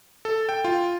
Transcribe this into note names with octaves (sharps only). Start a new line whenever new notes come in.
A4
G5
F4